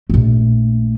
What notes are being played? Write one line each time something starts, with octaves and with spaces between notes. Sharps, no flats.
A#1 A3